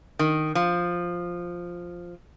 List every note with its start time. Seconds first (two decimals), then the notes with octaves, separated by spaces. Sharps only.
0.19 D#3
0.55 F3